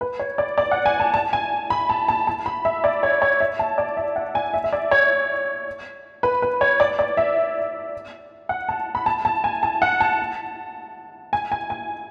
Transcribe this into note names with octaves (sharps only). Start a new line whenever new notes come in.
B4
C#5
D5
D5
F#5
G#5
A5
A5
G#5
B5
A5
A5
A5
B5
E5
D5
C#5
C#5
E5
A5
D5
E5
F#5
G#5
E5
E5
D5
C#5
B4
B4
C#5
D5
D5
E5
F#5
A5
B5
A5
A5
G#5
A5
F#5
A5
G#5
G#5
G#5